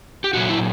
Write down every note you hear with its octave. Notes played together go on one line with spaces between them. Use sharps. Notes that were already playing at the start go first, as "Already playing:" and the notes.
G4
A#2 F#3 F#4
E4